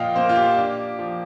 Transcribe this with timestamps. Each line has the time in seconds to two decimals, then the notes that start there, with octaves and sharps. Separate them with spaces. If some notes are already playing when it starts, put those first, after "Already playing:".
Already playing: A#2 F3 D#5 F5 G5
0.15 A#3 C5
0.29 F4
0.36 G4
0.56 D4
0.99 F3